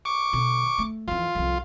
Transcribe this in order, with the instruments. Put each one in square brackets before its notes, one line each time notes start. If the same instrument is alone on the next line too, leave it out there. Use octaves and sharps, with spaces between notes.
[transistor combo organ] C#6 D6
[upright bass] B2 D3
A3
[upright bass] F2 E3 [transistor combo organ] F4
[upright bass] C2 F2